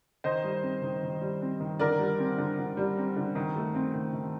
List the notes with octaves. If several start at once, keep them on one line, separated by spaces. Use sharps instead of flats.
D#3 C5 D#5
G3
C4
D#3
D#3
G3
C4
D#3
D3 A#4 D5
G3
C4
D3
D3
G3
C4
D3
D#3
A3
C4
D#3
D#3